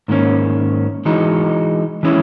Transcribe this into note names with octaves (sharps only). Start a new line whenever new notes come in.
G#2 D#3 A#3 C#4
E3 G#3 D#4 F#4
E3 G#3 C#4 E4